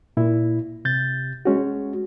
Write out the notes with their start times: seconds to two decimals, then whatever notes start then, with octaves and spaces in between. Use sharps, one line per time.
0.17 A#2 E4
0.85 C3 G6 A6
1.45 G#3 C#4 F#4